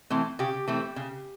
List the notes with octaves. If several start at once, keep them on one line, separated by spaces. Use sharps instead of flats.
E3 A3 C4
C#3 G4
E3 A3 C4
C#3